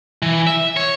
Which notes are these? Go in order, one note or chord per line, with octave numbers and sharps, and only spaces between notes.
E3
E5
C#5